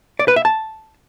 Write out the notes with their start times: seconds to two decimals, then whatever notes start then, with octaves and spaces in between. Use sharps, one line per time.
0.19 D5
0.28 B4
0.36 E5
0.45 A5